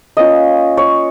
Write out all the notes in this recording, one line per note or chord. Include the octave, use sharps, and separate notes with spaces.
A#3 C#4 F4 D#5
C#5